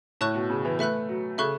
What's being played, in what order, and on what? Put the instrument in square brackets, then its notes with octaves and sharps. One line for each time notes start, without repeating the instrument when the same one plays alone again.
[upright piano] A2 [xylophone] C#5 A5 C#6 F#6
[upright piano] B2
C#3
E3
[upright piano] A3 [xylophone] B4 E5 B5 F#6
[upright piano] F#3
[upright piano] C#3 [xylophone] A4 E5 C#6 F#6